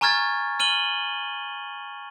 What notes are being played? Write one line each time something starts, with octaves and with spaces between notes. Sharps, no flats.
G#5 A#5 C#6 F6 G#6 A6
F6 D#7 F#7 G7